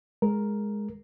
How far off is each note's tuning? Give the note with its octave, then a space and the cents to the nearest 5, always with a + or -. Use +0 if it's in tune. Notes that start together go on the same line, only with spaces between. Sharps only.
G#3 +0 A#4 +0